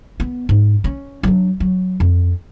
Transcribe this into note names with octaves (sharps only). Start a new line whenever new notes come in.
B3
G#2
C#4
F#3 D4
F#3
F2